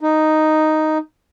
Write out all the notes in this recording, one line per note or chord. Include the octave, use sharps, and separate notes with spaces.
D#4